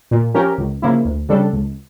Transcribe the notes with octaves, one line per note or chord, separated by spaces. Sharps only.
A#2
F3 C#4 G4 A#4
C#2
C#3 F3 A#3 E4
D2
C#3 G3 D4 A4
C#2